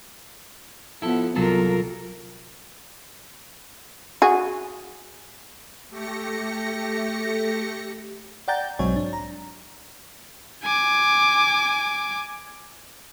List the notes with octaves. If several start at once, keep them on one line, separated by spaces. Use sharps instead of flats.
F3 B3 E4 A4
C2 F#3 F4 A4 A#4
F#4 G#4
A3 G4 A#6 C#7
D5 F#5 G5 A#5 G6 A6
B1 G#2 F#3 C4 C#5 G#5
D4
A#5
G#5 D6